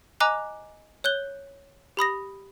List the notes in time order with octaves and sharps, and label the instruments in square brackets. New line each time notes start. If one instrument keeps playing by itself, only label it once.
[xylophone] D#5 G#5 A#5 D6 F#6 F7
C#5 F#6 G6 G7
G4 B5 D#6 A#6